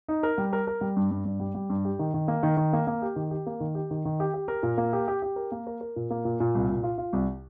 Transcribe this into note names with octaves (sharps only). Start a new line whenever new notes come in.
D#4
A#4
G3
A#4
A#4
G3
G2
G2
G2
G3
G3
G2
G4
D#3
D#3
A#3
D#3
D#3
A#3
A#3
G4
D#3
G4
A#3
D#3
G4
D#3
D#3
G4
G4
A#4
A#2
A#3
G4
G4
G4
A#4
A#3
A#4
A#4
A#2
A#3
A#2
A#2
C2
A#2
F4
F4
C2